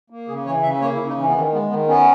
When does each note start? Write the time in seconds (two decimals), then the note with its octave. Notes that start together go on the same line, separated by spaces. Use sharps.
0.10 A#3
0.28 C#3 G#4
0.45 E3 C#5
0.63 C#3 E5
0.81 A#3 C#5
0.94 E4
0.99 C#3
1.08 D#4
1.17 E3 C#4
1.28 B3
1.34 D#3 C#4
1.52 G#3 B3
1.69 D#3 B3
1.87 B3 C#4